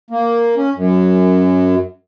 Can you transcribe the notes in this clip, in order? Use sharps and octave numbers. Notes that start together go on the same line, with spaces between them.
A#3
C#4
F#2